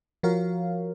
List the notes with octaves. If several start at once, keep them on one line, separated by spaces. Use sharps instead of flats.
F3 F#4 A#4 C#5 F5